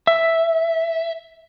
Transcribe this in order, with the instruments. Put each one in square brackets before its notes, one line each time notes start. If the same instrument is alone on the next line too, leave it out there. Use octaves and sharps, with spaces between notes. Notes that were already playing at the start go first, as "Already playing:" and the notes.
[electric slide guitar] E5